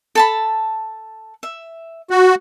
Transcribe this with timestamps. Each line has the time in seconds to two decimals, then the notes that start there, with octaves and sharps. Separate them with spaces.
0.15 A4 A5 B5
1.43 E5
2.10 F#4